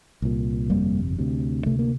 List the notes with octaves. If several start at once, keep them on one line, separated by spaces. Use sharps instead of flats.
C2 A#2
G1 F2 C3 G3 A#3
D2 C3
D2 C3 A3
A#3